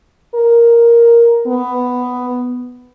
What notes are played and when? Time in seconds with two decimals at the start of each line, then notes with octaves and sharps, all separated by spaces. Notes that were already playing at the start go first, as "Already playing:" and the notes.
0.35 A#4
1.47 B3